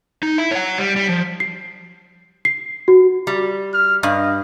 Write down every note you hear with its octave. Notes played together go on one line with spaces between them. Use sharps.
D#4
E4
C#5 F#5
G3
G3
F3
C7
C7
F#4
G3
F6
G2 D#5